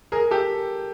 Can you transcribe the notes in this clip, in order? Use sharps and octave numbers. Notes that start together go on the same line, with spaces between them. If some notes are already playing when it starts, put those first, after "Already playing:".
G#4 A#4
G4 A4